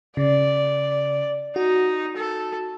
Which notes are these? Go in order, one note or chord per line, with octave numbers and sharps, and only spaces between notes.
C#3 D5
D#4 F#4
A4